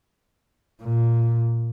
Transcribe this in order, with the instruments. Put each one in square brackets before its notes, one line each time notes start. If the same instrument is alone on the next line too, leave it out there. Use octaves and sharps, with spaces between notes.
[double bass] A#2